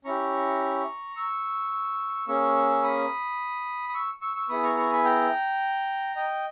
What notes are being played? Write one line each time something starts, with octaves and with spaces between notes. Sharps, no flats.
C#4 E4 G4 A#5 C#6
C#6 E6
A#3 C#4 G#4 C#6 E6
B5 D#6
D#6
C#6 E6
C#6 E6
C#6 E6
B3 E4 G#4 B5 D#6
A#5 C#6
A#5 C#6
G#5 B5
G5 A#5
D#5 G5